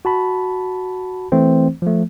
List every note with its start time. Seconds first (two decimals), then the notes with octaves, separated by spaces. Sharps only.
0.05 F#4 A5 B5
1.32 E3 A3 C4 C5
1.82 F3 A3